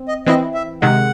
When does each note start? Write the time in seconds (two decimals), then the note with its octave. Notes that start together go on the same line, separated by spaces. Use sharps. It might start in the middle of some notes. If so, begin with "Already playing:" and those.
Already playing: C4
0.08 D#5
0.26 E3 C4 E4 D#5
0.54 E5
0.82 C3 D#3 G#3 F#5